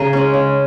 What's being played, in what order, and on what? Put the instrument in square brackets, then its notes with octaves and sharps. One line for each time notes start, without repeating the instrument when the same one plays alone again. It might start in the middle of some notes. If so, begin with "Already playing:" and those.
Already playing: [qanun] C#3 G#4 A#4
G#3 C#4
C#3